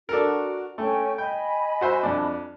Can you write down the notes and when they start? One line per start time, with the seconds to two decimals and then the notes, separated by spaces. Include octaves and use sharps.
0.09 D4 F#4 A4 A#4
0.78 A3 C#4 G5 G#5
1.18 D#5 G5 G#5 B5
1.81 F#4 C5 E5
2.03 F2 D4